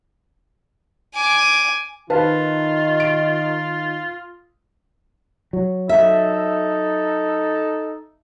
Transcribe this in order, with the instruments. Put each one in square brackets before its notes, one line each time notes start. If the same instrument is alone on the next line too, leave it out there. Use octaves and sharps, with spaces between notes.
[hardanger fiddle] G#5 D6
[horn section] D#3 [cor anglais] F4 [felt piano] B4 F5 A5
[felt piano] D7
[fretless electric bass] F#3
[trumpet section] D#4 A4 [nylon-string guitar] E5